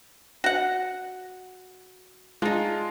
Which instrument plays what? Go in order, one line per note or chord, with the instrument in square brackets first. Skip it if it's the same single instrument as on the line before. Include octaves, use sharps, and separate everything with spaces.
[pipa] F#4 F#5
[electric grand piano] G#3 F4 [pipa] D4 D#4